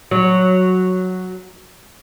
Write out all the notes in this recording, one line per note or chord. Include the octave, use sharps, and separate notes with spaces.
F#3